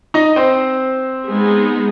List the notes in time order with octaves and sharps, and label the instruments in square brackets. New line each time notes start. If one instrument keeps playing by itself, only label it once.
[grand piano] D#4 D#5
C4 C5
[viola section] G#3 B3 D#4 G#4